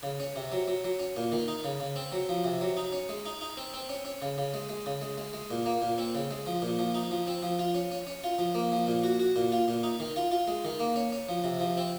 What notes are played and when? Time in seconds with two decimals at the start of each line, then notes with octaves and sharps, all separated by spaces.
0.03 C#3
0.20 C#4
0.36 C3
0.52 F#3
0.68 F#3
0.85 F#3
1.00 C#4
1.17 A#2
1.32 D#3
1.48 D#4
1.64 C#3
1.80 C#3
1.96 C4
2.12 F#3
2.29 F3
2.44 C3
2.61 F#3
2.77 D#4
2.93 C#4
3.09 G#3
3.26 D#4
3.41 D#4
3.57 C4
3.74 C4
3.89 C#4
4.05 C#4
4.22 C#3
4.38 C#3
4.54 G#3
4.69 G#3
4.86 C#3
5.02 G#3
5.18 G#3
5.33 G#3
5.51 A#2
5.66 A#3
5.82 A#2
5.98 C4
6.15 C#3
6.31 G#3
6.47 F3
6.62 A#2
6.79 F3
6.94 D#4
7.11 F3
7.27 C4
7.43 F3
7.59 F4
7.74 C#4
7.92 C#4
8.07 C#4
8.24 F4
8.39 F3
8.55 A#3
8.72 F3
8.87 A#2
9.04 F#4
9.19 F#4
9.36 A#2
9.52 F4
9.68 A#2
9.83 D#4
10.00 D#3
10.16 F4
10.31 F4
10.48 G#3
10.65 D#3
10.80 A#3
10.96 C#4
11.12 C#4
11.29 F3
11.44 C3
11.60 F3
11.77 C4